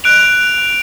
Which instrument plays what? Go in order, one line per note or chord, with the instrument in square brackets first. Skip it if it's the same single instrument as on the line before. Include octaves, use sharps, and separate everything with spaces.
[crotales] F#6 D7 F7